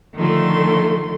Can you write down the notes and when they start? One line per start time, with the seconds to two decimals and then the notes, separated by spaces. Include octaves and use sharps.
0.17 D3 D#3 F3 A3 C6